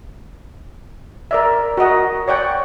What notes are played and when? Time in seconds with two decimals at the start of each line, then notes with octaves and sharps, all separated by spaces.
1.31 A#4 D5 E5
1.77 F#4 A#4 D#5 F#5
2.28 C#5 D5 F#5 G5